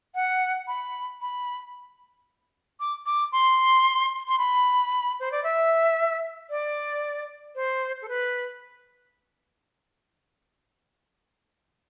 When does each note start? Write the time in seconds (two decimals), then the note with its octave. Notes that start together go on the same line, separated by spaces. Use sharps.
0.15 F#5
0.68 B5
1.21 B5
2.80 D6
3.06 D6
3.32 C6
4.28 C6
4.38 B5
5.20 C5
5.32 D5
5.44 E5
6.50 D5
7.55 C5
8.02 A4
8.08 B4